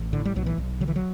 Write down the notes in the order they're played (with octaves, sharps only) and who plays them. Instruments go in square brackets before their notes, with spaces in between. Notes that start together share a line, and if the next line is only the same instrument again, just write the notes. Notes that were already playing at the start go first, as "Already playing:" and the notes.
Already playing: [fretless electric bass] A1
A2 D3
G3
B1 F#3
E3
B1
D3 F#3
E3
F#3